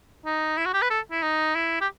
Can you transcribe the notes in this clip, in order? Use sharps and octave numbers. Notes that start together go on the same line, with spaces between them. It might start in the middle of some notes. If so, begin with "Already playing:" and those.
D#4
E4
F#4
G4
B4
A4
E4
D#4
E4
G4